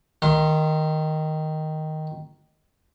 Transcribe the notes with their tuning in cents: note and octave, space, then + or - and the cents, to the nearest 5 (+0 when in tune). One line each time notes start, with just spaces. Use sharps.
D#3 +0 F5 -45 C6 +15